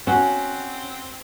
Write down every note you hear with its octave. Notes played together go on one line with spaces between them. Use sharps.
C4 C#4 F#4